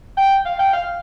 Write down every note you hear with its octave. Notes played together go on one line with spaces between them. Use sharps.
G5
F5
G5
F5